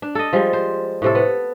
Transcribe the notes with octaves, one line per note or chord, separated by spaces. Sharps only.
D4
A4 D#5
F3 G3 G#3
C5
A2 C3 A4
B3